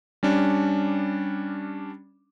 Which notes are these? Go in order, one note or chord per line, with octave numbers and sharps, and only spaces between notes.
G3 C#4 D4